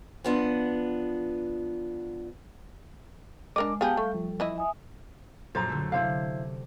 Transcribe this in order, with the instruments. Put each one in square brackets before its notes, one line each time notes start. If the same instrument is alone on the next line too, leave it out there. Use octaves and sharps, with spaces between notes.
[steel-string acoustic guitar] F3 B3 D4
[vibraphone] G#3 [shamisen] D4 A#4 D#5 [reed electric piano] D6
[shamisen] B3 G4 G#4 [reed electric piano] F5 G6 [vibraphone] G5 A5
[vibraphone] G3 A4 [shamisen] A3
[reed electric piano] F3
[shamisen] E3 E4 D#5
[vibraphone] E5 G#5 D#6
[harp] A#1 F#2 A6 [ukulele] C5 A#5
[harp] D3 A3
[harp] C3 [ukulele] E4 C5 F5